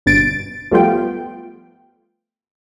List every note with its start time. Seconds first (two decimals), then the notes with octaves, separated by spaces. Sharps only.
0.06 G1 G2 B2 A6 D7
0.71 F3 G3 A3 B3 F4 G5